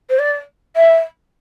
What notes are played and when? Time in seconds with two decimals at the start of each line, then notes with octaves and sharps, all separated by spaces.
0.10 C5
0.19 D5
0.76 E5